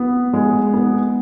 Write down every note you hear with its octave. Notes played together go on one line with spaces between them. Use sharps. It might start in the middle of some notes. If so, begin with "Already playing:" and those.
Already playing: B3
G#3
B3